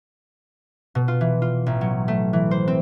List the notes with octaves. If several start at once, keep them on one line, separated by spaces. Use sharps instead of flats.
B2
F4
E3
F4
A1
F#3
A3
E3
C5
C4